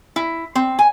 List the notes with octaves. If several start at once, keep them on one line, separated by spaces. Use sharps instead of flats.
E4
C4
G#5